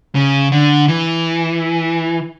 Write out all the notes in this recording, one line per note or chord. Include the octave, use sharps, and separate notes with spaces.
C#3
D3
E3